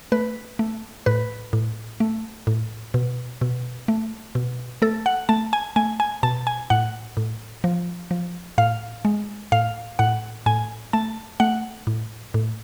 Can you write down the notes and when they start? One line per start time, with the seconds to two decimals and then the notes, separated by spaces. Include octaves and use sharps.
0.12 A3 B4
0.59 A3
1.06 A2 B4
1.53 A2
2.00 A3
2.47 A2
2.94 B2
3.41 B2
3.88 A3
4.35 B2
4.82 A3 A4
5.06 F#5
5.29 A3 A5
5.53 G#5
5.76 A3 G#5
6.00 G#5
6.23 B2 A5
6.47 G#5
6.70 A2 F#5
7.17 A2
7.64 F3
8.11 F3
8.58 A2 F5
9.05 G#3
9.52 A2 F5
9.99 A2 F#5
10.46 A2 G#5
10.93 A3 A5
11.40 A3 F#5
11.87 A2
12.34 A2